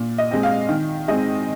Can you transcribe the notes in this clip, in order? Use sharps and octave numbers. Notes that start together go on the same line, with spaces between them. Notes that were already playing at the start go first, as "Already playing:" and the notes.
Already playing: A#2
D#5
G#3 C4
F5
D#3
G#3 C4 D#5